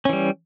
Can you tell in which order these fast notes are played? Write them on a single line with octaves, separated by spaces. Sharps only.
C#4 E3 G3